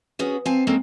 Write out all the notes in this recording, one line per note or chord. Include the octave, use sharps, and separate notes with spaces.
B3 C#4 F#4 G#4
C4 F5 G#5 A5
G#3 A#3 C4 C#4 A4